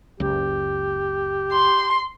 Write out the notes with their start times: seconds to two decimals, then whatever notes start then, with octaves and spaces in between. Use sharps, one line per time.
0.20 F#1 C#2 G4
1.52 C6